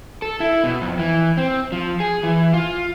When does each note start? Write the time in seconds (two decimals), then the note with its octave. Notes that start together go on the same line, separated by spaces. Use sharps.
0.22 A4
0.40 E4
0.64 B2
0.81 F2
0.99 E3
1.37 C4
1.72 F3
2.00 G#4
2.23 E3
2.53 F4